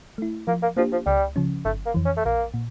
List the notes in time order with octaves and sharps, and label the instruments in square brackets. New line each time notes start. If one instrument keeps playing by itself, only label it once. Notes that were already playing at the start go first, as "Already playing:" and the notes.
[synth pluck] A3 E4
[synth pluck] F3 [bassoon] A#3
[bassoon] A#3
[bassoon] F3 [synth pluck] A#3 D4 G4
[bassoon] F3
[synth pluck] C#2 [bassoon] G3
[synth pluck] C#3 F3 C#4
[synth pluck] G1 [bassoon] A3
[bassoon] A#3
[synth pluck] F2 E3
[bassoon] C#4
A3
[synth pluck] A#1 [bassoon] A#3
[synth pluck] A#2